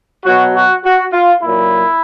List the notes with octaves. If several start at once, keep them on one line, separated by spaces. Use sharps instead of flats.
B2 F#3 F#4
F#4
F#4
F4
A#2 F#3 E4